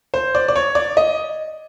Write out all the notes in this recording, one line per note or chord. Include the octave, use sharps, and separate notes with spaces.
C5
D5
D5
C#5
D5
D#5